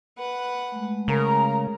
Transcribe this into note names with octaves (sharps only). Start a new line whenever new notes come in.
B4 F#5
G#3 A3
C#3 A#4 A#5